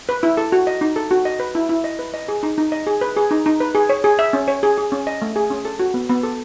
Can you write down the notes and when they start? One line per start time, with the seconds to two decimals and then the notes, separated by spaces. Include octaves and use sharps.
0.09 B4
0.23 E4
0.37 A4
0.52 F#4
0.67 D#5
0.81 D#4
0.96 A4
1.11 F#4
1.25 D#5
1.40 B4
1.55 E4
1.69 E4
1.84 D#5
1.99 B4
2.14 D#5
2.28 G#4
2.43 D#4
2.58 D#4
2.72 D#5
2.87 G#4
3.01 B4
3.17 G#4
3.31 D#4
3.46 D#4
3.60 B4
3.75 G#4
3.89 C#5
4.04 G#4
4.19 E5
4.33 C#4
4.48 C#5
4.63 G#4
4.78 G#4
4.92 C#4
5.07 D#5
5.22 A3
5.36 G#4
5.50 C#4
5.65 A4
5.80 F#4
5.94 B3
6.09 B3
6.23 A4